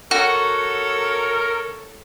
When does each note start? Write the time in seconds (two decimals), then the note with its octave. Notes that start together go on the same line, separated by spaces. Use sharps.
0.11 F#4 A4 A#4 C#5